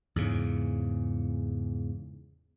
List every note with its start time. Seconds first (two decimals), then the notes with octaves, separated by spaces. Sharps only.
0.16 E2 G#2 C#3